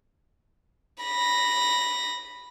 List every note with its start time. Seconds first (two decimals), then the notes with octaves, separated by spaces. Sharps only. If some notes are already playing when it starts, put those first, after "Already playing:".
1.04 B5 A#6